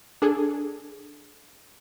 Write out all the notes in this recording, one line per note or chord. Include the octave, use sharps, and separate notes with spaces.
D4 G#4 A4